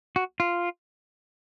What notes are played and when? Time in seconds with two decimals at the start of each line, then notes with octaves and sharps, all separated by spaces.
0.16 F#4
0.40 F4